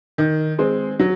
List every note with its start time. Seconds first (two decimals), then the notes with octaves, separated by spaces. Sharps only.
0.18 D#3
0.59 G#3 C4
1.00 F#3